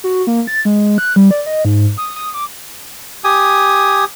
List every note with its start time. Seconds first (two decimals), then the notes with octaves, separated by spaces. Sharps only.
0.04 F#4
0.27 A#3
0.47 A6
0.65 G#3
0.98 F#6
1.16 G3
1.31 D5
1.46 D#5
1.65 G#2
1.97 D#6
2.16 D#6
2.34 D6
3.24 G4 G#5 D#6